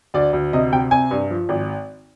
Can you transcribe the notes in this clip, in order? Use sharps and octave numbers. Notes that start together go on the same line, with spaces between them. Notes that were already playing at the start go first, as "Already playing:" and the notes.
D2 D5
D2
C3 D#5
C3 G5
C4 G#5
G2
F3
G#1